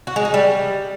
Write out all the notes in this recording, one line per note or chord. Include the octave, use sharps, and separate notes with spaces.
F#4
G#3
D#4
G3